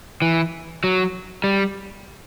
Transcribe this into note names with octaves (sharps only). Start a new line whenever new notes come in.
E3
F#3
G3